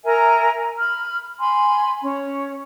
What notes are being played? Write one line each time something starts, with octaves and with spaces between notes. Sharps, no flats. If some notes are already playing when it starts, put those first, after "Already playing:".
A#4 E5 G#5 A#5
B5 F6
G#5 B5 C6
C#4